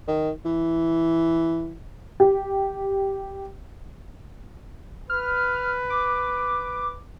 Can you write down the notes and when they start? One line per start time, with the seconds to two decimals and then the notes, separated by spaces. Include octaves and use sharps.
0.08 D#3
0.45 E3
2.20 G4
5.10 B4 F6
5.90 D6